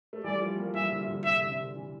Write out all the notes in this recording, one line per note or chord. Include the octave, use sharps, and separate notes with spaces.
A3
E3 G3 D5
F3 A3
G3 A#3
E3 G3 E5
D3 F3
D3 F3
C3 E3 E5
D3
C3
D3
C3 E3